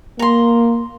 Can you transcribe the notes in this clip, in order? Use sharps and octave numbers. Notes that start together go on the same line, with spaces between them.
A#3 A#5 C6